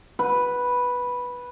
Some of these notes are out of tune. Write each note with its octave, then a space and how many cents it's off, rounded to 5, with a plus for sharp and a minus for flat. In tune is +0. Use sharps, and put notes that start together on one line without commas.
B4 -5